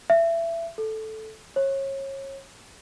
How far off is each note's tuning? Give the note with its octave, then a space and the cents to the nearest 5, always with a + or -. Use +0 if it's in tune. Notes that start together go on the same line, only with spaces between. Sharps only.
E5 +25
A4 -10
C#5 -30